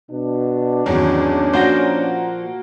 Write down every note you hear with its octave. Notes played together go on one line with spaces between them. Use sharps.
B2 D4
G#1 E2 D#3 F#3 C#4
A#2 F3 A#3 F#4 C5 A#6